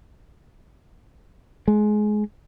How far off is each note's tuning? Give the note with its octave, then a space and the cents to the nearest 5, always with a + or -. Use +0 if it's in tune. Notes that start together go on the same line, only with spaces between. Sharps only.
G#3 +20